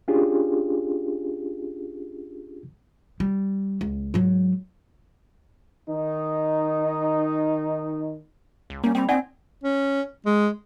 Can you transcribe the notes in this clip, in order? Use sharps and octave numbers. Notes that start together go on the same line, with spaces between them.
C#4 D4 F4 G4 G#4
G3
C#2
G#2 F#3
D#3 D#4
C#2
G3 A#3 C#4
G3 C4 G5 B5
C4 D#4 D5 F#5 G#5
C#4
G#3